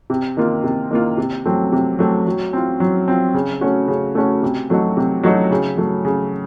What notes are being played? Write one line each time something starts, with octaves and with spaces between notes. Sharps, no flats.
C3
D#3 A#3 F4
C3
D#3 A#3 F4
C3
F#3 A3 C4
C3
F#3 A3 C4
F#3
C4 F4
F#3
C4 F4
C#3
A3 C#4 F#4
C#3
A3 C#4 F#4
C3
F#3 A3 D#4 F#4
C3
F#3 A3 D#4 F#4
C#3
F#3 A3
C#3